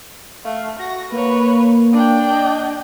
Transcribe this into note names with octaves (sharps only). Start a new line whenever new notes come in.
A3 F5
F#4 A#6
A#3 B4 C#5
D4 G5
D#5